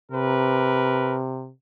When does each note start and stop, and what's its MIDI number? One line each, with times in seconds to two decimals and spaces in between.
0.12 1.50 48
0.12 1.17 70
0.12 1.17 71